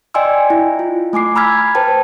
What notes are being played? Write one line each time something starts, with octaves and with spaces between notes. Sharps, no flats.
D5 D#5 G5 G#5 C6 E6
E4
F4
A3 G#5 D6 C7
A#5 B5 E6 F6 G#6 B6
B4 C5 G5 A5